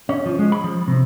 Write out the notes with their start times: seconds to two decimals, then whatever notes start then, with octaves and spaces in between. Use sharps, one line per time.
0.09 C#4
0.26 F3
0.39 G#3
0.52 B5
0.64 F3
0.88 C3